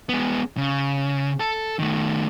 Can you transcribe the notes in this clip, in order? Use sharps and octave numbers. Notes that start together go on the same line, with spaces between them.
G#3 B3
C#3
A4
D#3 A3